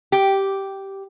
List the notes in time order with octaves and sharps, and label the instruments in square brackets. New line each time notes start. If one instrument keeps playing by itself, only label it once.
[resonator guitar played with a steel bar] G4